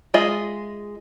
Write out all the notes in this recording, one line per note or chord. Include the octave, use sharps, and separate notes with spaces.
G#3 F4 G#4 D#5 E5